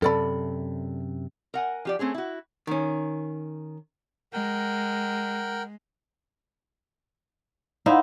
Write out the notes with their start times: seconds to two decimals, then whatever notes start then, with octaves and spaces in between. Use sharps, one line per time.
0.02 F#2 C3 A4 D5 B5
1.54 A#4 F#5 G#5
1.85 F3 G4 D5
1.99 A3 C4 C#4 G#4
2.14 E4 F#4
2.67 D#3 C#4
4.33 G#3 A#4 F#5 G5
7.86 D#4 E4 C5 F5 F#5